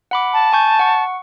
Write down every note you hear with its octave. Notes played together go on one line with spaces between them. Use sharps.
F#5 B5 D6
A5
G#5 C#6 G6
F#5 C#6